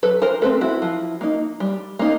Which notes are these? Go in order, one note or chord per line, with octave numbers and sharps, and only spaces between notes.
F#3 A4 B4
A#4 C5
A3 C4 A4 B4
E4 F#4
F3
A#3 D#4
G3
A#3 D#4